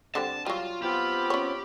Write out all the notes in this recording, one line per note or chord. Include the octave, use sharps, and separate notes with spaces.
D3 G3 C4 A5
F#3 G3 F4
B3 C4 F4 G4 B5
C#4 C#5